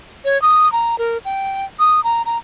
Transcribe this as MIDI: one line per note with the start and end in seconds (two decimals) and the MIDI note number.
0.25 0.40 73
0.42 0.71 87
0.72 0.98 82
0.98 1.18 70
1.25 1.65 79
1.79 2.03 87
2.04 2.22 82
2.26 2.37 82